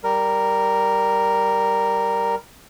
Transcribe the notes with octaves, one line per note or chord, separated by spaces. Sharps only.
G3 A#4